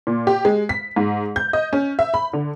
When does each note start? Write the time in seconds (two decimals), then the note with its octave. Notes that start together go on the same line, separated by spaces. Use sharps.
0.07 A#2
0.27 G4
0.45 G#3
0.69 B6
0.96 G#2
1.36 G6
1.53 D#5
1.73 C#4
1.99 E5
2.14 B5
2.33 D3